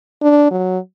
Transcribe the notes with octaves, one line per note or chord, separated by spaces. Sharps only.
D4
F#3